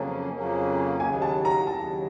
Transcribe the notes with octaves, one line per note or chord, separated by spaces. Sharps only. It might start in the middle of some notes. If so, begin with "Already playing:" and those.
Already playing: F2 C#3 F#3 A#3 C#4 A5
F2 C#3 F#3 A#3 C#4
D#2 C#3 F#3 G#5
A5
A#5
D#2 C#3 F#3 A5